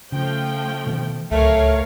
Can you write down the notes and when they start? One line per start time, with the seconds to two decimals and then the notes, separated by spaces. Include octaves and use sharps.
0.12 C#3 F3 A3 G5
0.87 B2 D#3 E3
1.31 D1 C#2 A3 A#4 C#5 F5